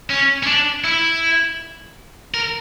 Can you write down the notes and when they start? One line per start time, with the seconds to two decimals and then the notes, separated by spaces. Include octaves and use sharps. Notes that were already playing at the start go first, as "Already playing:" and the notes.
0.10 C#4
0.43 C#4
0.47 D4
0.84 E4
2.34 A#4